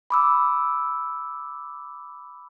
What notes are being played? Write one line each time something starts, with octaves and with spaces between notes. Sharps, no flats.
B5 D6 E6